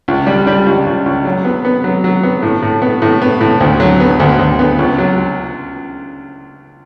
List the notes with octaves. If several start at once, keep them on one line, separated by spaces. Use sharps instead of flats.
C#2
G3
G3
C#2
C#2
C#2
F#3
B3
B3
F#3
F#3
B3
A2
A2
B3
A2
B3
A2
D2
F#3
B3
D2
D2
B3
C#2
F#3